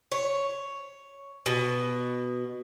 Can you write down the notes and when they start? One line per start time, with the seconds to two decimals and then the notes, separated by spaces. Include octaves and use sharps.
0.12 C#5
1.46 B2